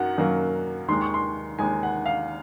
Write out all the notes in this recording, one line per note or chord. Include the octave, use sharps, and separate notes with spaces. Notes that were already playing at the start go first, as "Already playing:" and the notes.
Already playing: F#2 D#3 F#3 F#5
F#2 D#3 F#3 A#3
D#2 D#3 G#3 C6
C#6
C6
D#2 D#3 G#3 G#5
F#5
F5